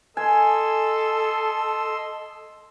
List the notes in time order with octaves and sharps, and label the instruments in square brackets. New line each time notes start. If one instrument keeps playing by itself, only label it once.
[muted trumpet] A4 [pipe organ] D#5 C6 E6 [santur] G#5